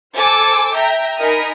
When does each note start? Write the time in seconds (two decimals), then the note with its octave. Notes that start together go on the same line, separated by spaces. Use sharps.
0.14 A4 C5 G#5 D6 E6
0.75 E5 G5 A#5
1.18 D#4 A#4 D#5 G#5 B5 D#6